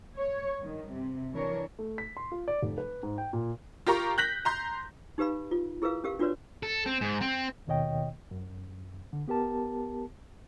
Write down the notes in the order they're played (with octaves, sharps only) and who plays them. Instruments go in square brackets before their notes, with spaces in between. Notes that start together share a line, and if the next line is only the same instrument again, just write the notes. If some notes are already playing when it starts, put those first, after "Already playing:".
[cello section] C#5
G2 D#3
C3
E3 D4 A#4 C#5
[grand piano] A3
B6
C6
F4
D5
F1
B4
G#2
G5
A#2
[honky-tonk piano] F4 G4 A#4 A#5 C#6
F#6 G6 A#6 B6 F#7
A#5 C6 G6
[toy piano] D#4 G4 B4 F5 B5
F4
E4 G#4 A#4 B4 E5 F5
C#4 G4 A#4 F5
D4 F4 F#4 B4 C#5 D5
[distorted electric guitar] A4
C4
G#2
C4
[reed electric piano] D#2 B2 D#3 C#5 D#5 G5
F#2
D3
B3 G4 A#4 A5